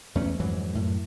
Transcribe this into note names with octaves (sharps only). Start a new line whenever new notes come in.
E2 A3 C#4
F2 G#2 E3 F#3
F#2 A2